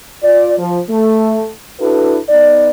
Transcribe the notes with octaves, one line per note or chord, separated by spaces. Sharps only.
F4 D5
F3
A3
D4 E4 F#4 A4 B4
B3 D#4 D5